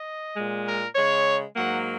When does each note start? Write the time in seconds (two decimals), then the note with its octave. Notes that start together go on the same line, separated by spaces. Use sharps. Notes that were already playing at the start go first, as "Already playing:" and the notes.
Already playing: D#5
0.36 A#2 G#3
0.66 A#4
0.95 C#3 G#3 C#5
1.55 G#2 F#3 A#3 F#5